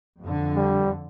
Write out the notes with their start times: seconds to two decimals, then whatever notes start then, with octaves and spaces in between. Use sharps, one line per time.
0.21 F2 D3
0.56 G3